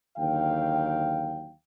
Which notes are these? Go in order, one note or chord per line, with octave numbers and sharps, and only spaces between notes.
D#2 D3 F#3 F5 G5